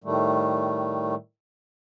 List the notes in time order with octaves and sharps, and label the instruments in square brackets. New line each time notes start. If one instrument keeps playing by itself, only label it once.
[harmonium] A2 D#3 G3 A3